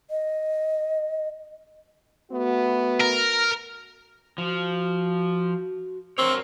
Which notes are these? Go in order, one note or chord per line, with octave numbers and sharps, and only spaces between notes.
D#5
A3 B3 F#4
A#4
F3 F#4
C4 A#4 C#5